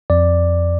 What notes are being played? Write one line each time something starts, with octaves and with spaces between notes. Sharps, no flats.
F2 D5